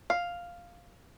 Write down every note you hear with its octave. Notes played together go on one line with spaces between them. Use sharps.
F5